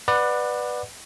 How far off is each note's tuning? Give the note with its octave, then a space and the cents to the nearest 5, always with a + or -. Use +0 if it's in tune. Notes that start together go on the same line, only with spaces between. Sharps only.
B4 +0 D5 +25 F#5 -10